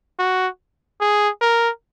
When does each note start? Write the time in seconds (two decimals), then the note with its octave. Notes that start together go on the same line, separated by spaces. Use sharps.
0.19 F#4
1.01 G#4
1.41 A#4